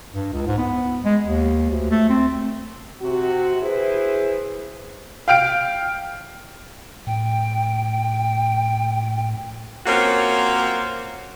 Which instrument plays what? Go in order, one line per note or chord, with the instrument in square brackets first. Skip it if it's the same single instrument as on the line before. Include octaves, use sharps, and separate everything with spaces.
[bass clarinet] G2
C#2
G#2
B3
G#3
D#2
D2
A3
C4
[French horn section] C3 F#4
E4 G#4 B4 C5
[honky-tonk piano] F5 G5 F6 D7
[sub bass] A2 [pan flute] G5
[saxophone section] A#3 C4 C#4 F4 F#4 A#4